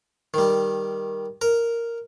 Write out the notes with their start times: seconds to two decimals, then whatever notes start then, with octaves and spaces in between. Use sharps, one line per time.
0.34 D#3 G3
1.41 A#4